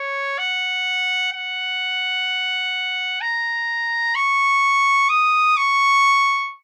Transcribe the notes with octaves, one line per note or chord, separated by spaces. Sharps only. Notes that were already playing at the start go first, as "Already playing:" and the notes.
Already playing: C#5
F#5
F#5
A#5
C#6
D#6
C#6